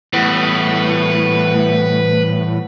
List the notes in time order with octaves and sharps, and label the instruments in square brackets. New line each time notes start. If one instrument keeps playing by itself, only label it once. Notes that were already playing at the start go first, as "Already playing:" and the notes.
[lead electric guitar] A2 [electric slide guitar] E3 G3 [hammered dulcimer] B3 [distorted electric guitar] B4